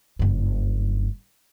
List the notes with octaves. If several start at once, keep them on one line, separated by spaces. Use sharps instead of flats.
F#1 G2